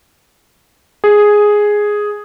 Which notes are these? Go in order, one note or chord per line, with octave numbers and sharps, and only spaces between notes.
G#4